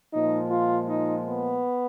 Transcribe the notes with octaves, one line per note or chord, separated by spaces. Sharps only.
A#2 F3 G#3 D#4
F4
D#4
B3